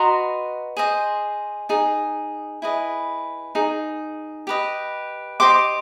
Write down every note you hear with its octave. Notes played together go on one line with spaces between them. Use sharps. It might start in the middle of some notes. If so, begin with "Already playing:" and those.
Already playing: F#4 B4 D#5 A#5 C6
G#4 C5 D#5
D#4 G#4
E4 G#4 B4 D#5
D#4 G#4
G4 B4 D#5
G4 C5 D#5 C6 D6